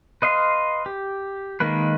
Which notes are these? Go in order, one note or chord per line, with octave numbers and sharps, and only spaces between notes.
B4 D#5 F5 C6
G4
D#3 G#3 A#3 B4